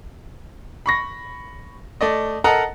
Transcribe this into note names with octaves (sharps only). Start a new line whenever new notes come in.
B5 C#6 A#6
A3 D5 D#5
A4 A#4 D#5 F#5 A5 A#5